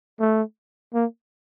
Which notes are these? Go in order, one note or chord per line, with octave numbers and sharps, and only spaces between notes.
A3
A#3